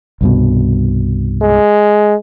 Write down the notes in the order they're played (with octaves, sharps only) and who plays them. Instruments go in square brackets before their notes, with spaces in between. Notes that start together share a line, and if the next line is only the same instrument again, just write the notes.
[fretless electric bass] C2 G2 B2
[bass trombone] G#3